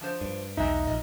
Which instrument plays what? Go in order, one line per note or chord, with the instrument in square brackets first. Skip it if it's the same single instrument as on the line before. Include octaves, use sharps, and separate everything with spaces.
[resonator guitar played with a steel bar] F3 D4 C5
[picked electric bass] G2
[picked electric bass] E1 B1 [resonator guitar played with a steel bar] G#3 E5 [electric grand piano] D#4 A#5
[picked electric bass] A#1 [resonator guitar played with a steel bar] D#5